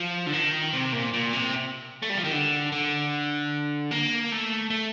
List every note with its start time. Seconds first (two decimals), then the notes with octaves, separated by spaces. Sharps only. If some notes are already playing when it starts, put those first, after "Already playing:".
Already playing: F3
0.27 D3
0.33 D#3
0.73 C3
0.93 A#2
1.13 A#2
1.33 C3
2.02 A3
2.10 G3
2.18 F3
2.24 D#3
2.32 D3
2.72 D3
3.91 A#3
4.32 A3
4.70 A3